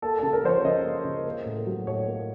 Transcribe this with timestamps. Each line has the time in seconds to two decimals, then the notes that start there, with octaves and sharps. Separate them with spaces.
0.02 A#3 A4
0.19 C#3 A4
0.33 A#4
0.43 F3 C5
0.49 C#5
0.64 C#3 D#5
0.85 A#3
1.04 C#3
1.25 A#3
1.45 A2
1.67 F#3
1.87 A2 C#5
2.07 A#3